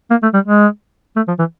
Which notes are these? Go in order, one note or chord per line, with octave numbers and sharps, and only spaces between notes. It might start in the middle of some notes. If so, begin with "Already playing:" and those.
A#3
A3
G3
G#3
A3
F3
E3